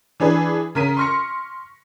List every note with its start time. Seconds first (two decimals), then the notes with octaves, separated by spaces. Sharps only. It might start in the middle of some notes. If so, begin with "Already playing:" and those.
0.20 E3 D4 G#4 B4
0.75 C#3 A#4 B6 D#7
0.97 C6 C#6 F6 A#6 C#7